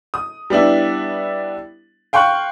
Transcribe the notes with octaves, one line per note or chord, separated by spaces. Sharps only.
D#6
G3 B3 D4 E4
F5 G5 C6 C#6 F#6